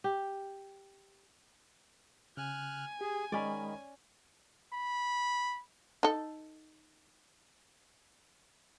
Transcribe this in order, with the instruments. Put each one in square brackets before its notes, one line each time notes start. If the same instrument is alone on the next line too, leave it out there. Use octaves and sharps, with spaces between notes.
[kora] G4
[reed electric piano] C#3 [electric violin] G#5 [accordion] F6 F#6
[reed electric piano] G4 [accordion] G#4
[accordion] D#3 [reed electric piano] G#3 D#5 B5 [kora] C#4 D5
[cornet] B5
[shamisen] D#4 A4